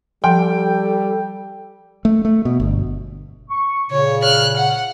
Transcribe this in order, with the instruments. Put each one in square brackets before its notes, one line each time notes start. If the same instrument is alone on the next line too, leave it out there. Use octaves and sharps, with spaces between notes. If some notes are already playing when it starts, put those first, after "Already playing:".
[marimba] F3 C6 [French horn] G3 [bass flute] A4 [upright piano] G5
[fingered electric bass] A3
A3
B2
G1
[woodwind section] C#6
[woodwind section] A#2 C#3 [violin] C#5
[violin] F6 F#6
F#5